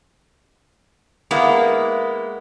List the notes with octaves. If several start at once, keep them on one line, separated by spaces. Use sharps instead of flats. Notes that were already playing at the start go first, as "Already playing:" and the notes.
G#3 A#3 B3 E4